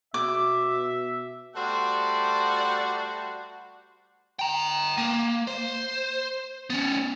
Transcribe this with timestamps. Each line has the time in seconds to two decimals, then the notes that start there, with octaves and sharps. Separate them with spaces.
0.14 B2 E5 D6
1.55 G3 A3 F#4 C5 D5 F#5
4.39 G5 A#5
4.98 A#3
5.47 C5
6.70 B3 C#4